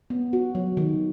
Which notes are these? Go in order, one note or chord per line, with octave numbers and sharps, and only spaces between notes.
B3
F#4
F#3
D#3